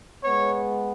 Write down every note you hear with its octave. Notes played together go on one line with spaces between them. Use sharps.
G#3 B3 C#5